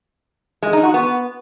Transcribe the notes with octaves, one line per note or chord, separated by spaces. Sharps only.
G#3
D#4
F#4
B3